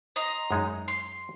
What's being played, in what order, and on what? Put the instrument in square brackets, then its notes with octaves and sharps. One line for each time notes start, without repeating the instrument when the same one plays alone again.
[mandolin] D#5 A#5 C6
[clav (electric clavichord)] F#2 G#3 D#4
[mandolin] C6